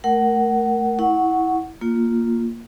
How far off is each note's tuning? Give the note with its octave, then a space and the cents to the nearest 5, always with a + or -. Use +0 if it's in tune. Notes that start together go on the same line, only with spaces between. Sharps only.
A3 +0 A#4 +0 F#5 +20
E4 -20 F#5 +0 C#6 -5
A#3 +0 F4 +0